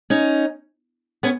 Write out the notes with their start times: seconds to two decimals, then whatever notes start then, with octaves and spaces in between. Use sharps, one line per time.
0.10 C#4 D#4
1.23 B3 C#4